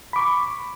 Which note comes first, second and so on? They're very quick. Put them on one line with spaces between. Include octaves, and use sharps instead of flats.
B5 D6 C#6